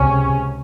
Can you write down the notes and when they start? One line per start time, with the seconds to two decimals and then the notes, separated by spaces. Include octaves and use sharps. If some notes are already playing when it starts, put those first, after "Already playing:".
Already playing: C#2 C3 C#4